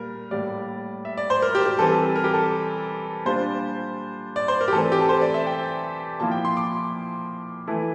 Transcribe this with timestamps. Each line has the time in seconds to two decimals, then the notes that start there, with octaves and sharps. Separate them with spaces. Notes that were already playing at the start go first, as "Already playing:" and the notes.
Already playing: A#2 G3 A#4
0.31 A2 G3 A#3 D5
1.05 E5
1.17 D5
1.30 C5
1.42 A#4
1.55 G4
1.66 G4
1.79 E3 G3 C4 A4
1.91 A4
2.16 A#4
2.24 G4
2.33 A4
3.25 A#2 G3 D4 F4 C5
4.36 D5
4.48 C5
4.61 A#4
4.68 G4
4.72 E3 A3 C4 A4
4.92 G4
5.01 A4
5.09 C5
5.21 D5
5.34 E5
5.47 G5
6.20 A#2 F3 A#3 E4 A5
6.31 G5
6.45 C6
6.57 D6
7.67 E3 A3 E4